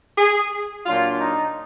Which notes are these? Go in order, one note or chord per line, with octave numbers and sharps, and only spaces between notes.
G#4
A#2 F#3 D4 F4
D#4